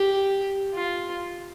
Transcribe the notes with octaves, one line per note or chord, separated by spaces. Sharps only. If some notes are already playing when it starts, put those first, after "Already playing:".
Already playing: G4
F4